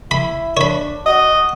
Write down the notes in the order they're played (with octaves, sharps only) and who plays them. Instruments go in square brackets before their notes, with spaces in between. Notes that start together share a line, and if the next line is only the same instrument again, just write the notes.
[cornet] E4 [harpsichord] B5
[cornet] D4 [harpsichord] C#5 B5
[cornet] F#4 [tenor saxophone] D#5